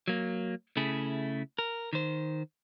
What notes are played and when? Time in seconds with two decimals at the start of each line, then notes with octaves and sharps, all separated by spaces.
0.08 F#3 A#3
0.77 C#3 A3 E4 G#4
1.59 A#4
1.93 D#3 C5